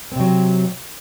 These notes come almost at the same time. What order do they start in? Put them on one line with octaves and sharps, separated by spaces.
C4 C3 F#3